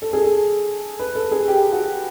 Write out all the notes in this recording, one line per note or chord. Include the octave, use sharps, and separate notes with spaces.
A4
G#4
A4
B4
A4
G#4
G4
F#4